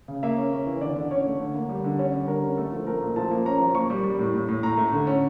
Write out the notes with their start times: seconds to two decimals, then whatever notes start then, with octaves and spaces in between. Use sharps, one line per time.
0.08 C#3
0.23 A#3 E5
0.38 C#4
0.52 C#4
0.66 E3
0.81 D3 D5
0.96 D3
1.11 C#4 C#5
1.26 A3
1.41 D3
1.55 A#3
1.69 G3
1.84 D3
1.99 C#4 C#5
2.13 G3
2.28 D3 A#4
2.43 C#4
2.57 A3 A4
2.72 F3
2.87 A3 A#4
3.02 A#2
3.16 F3 A5
3.31 A#3
3.46 C#4 A#5
3.60 F3
3.75 A#3 C#6
3.90 G3
4.04 G3
4.19 A2
4.34 A2
4.49 A2
4.63 A2 A#5
4.77 A3
4.93 D3
5.07 C#4